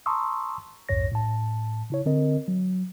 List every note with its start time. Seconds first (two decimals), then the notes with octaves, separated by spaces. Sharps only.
0.06 A5 A#5 C6 C#6 D#6 E6
0.89 B1 F2 G#2 C#5 A#6
1.12 A2 A5
1.90 C#3 E4 C#5
2.06 D3 C4 A#4 D#5
2.48 F#3